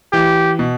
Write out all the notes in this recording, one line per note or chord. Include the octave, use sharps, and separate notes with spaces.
E3 G4
B2